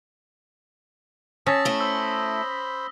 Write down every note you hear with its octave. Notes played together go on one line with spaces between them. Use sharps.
C#4 A5 D#6 E6 A#6 B6
A3 E4 G7
C5 B5 E6